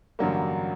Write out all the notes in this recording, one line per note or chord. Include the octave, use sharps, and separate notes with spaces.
A1 G2 D3 F#3 A#3